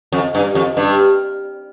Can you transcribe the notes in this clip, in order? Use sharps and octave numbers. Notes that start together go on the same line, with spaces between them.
F2
G2
F2
G2